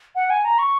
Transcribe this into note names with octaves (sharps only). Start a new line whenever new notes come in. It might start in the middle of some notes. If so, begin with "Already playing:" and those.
F#5
G#5
A#5
C#6